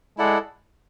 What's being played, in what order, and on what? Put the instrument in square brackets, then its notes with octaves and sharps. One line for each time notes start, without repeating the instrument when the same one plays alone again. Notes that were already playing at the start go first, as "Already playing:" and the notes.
[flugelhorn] G#3 [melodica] E4 A4 D5 F#5